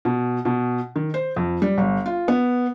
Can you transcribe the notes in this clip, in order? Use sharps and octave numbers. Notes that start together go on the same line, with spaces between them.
B2
B2
D#3
C5
F2
G3
G1
F4
B3